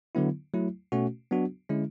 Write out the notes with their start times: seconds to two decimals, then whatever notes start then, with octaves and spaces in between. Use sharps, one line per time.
0.15 D3 F#3 B3 E4
0.54 F#3 A3 E4
0.92 B2 A3 C#4 F#4
1.31 F#3 B3 D4 F#4
1.69 D3 G#3 C#4 E4